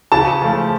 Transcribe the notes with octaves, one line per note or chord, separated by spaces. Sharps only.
C#3 A5
F3 A3